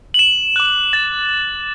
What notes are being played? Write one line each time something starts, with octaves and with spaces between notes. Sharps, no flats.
F#7
E7
D6 F#6
A6